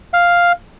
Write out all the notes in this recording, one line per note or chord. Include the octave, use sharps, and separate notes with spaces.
F5